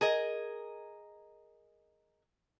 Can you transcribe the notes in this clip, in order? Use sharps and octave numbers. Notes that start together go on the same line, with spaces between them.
G#4 A#4 D#5